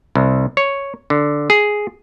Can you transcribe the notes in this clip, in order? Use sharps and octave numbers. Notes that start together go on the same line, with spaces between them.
C2
C#5
D3
G#4